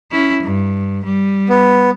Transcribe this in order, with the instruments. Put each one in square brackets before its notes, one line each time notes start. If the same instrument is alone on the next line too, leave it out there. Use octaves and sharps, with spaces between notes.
[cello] C#4 E4
G2
G3
[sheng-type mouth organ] B3